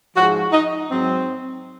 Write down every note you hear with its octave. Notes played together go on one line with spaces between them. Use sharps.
G#2 F3 G#3 F#4
D#4
G#2 F#3 C4